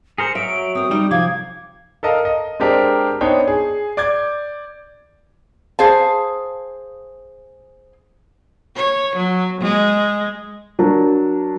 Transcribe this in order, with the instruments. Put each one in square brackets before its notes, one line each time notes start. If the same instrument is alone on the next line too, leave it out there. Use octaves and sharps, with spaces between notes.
[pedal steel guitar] G#4 A#4 C5 [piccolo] C#7
[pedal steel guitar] F#3 [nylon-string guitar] E5 [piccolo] D7
[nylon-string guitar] C4 A#4 [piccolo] D#6
[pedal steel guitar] G3 [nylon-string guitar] D#4
[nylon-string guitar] C3 F3 F5 [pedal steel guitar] D6 [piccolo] G#6
[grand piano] A4 A#4 D#5 F5
D#5
G#3 C4 D4 G4 A#4
B3 D4 D#4 C5 C#5 G5
G#4
D5 D6 G6 G#6
[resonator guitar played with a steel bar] G#4 C5 F5 A5
[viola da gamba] C#5
F#3
G#3
[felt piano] F#3 D4 A#4